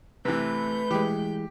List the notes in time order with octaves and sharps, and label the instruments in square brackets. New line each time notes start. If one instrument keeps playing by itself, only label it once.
[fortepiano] C3 E3 [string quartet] A3 G6 [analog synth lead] B4
[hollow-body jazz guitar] E3 G#3 [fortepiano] G4